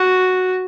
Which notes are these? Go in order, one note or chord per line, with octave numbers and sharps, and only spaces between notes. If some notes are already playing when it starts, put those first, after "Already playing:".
Already playing: F#4